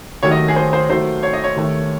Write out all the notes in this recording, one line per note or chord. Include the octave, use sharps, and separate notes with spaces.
D#2 D#3 F#3 A3 C#5
D#5
G#4
C5
C5
D#2 D#3 F#3 A3 C5
C#5
D#5
C#5
D#2 D#3 A3